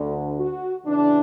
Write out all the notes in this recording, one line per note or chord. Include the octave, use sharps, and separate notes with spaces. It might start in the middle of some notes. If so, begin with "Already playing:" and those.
Already playing: D2 D3
F#4
E2 C#3 E3 D4